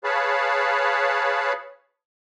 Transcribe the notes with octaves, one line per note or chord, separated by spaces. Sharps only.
G#4 B4 C#5 F5 A5 B5